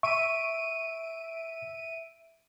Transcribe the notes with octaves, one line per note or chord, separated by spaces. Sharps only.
E5 C#6 D7 D#7